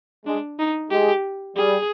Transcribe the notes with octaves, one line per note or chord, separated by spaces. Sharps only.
G#3 D4
D#4
G#3 G4
G3 G#4